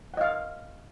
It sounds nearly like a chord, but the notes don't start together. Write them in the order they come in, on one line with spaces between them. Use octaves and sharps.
F#5 D#5 F5